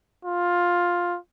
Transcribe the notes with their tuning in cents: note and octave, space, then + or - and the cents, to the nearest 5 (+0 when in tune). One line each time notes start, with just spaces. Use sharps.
F4 +10